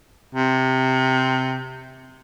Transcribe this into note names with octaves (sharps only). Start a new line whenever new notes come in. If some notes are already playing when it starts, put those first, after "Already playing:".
C3